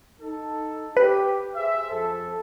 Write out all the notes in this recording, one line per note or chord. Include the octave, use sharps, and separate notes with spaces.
D#4 A4
G4 B4
G#4 C5 E5
F2 A4